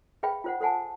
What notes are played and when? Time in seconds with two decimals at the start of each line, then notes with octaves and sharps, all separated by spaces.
0.23 G#4 B4 E5 F5 G5 B5
0.44 F4 C5 F#5
0.61 A4 C5 F#5 G#5 A5